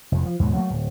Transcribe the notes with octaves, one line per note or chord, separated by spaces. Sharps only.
F1 E2
F3
D#2 G#2 B2
F#3 A3 A#3
D1